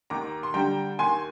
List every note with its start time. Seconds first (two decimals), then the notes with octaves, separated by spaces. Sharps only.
0.10 D#2 A#5 D6
0.43 C6
0.54 D3 G3 G5 A#5
0.99 D#2 G#5 C6